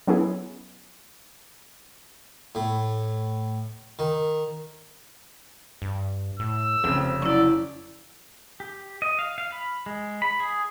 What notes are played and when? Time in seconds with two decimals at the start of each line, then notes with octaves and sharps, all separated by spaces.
0.07 F#3 B3 C#4 E4 G#4
2.55 A2
3.99 D#3
5.82 G2
6.40 A2 E6
6.84 F1 C#3 C4
7.22 F#3 C#4 E4 D5
8.60 G4
9.02 D#5
9.19 F5
9.38 F5
9.52 B5
9.86 G#3
10.22 B5
10.40 G#4